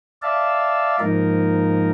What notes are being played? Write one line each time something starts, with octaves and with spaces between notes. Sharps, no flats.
D5 E5 F5 A5
G#2 F3 A#3 D#4 A#4